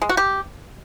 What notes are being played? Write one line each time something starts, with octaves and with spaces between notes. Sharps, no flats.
G#3
F#4
G4